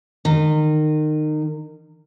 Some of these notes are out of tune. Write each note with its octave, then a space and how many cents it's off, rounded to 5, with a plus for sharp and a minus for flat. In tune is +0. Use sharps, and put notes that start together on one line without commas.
D#3 -25